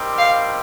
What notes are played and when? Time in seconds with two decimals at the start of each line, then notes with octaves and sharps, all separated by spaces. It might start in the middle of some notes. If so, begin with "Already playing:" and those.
Already playing: D#3 G3 C4 G4
0.18 F5